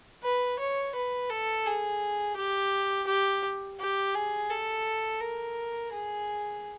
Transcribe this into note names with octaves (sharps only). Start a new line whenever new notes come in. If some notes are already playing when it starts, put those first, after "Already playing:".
B4
C#5
B4
A4
G#4
G4
G4
G4
G#4
A4
A#4
G#4